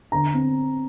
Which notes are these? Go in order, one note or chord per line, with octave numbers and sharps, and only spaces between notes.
D3 A#5
C4